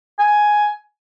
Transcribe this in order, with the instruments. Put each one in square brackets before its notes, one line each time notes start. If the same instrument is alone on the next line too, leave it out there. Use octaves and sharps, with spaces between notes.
[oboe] G#5